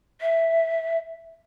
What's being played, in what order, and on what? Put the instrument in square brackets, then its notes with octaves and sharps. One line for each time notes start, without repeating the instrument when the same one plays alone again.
[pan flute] E5